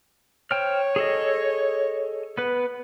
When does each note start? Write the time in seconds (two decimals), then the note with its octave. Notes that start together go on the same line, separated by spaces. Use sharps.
0.51 C5 C#5 G5 F6
0.96 G#4 A4 D#5
2.38 B3 B4